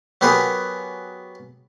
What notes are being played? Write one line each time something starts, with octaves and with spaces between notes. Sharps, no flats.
F#3 B3 G4 G#4 A#4